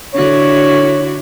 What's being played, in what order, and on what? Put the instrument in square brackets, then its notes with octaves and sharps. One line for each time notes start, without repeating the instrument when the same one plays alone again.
[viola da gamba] D3 E4 F#4 [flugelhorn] C#5